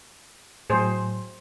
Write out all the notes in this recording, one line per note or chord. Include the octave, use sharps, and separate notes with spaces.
A2 F#3 G#4 C5